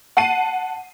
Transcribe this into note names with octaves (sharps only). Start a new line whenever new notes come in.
F#5 A5 C7 D#7